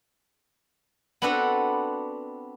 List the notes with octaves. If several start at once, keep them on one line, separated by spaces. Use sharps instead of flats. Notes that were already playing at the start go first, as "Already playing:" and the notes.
B3 C4 D4 F#4 A4 B4